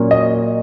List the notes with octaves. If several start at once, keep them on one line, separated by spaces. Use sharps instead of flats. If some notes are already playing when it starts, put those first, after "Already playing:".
Already playing: A#2 F#3 A#3 C#4
D#5